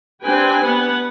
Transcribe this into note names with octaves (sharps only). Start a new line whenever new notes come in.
C4 D4 G4 B4 G5 G#5
B3 B4 F#5